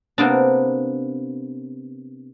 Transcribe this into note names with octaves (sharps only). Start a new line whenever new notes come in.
C3 A#3 B3 D4